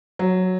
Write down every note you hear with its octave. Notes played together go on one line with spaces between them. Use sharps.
F#3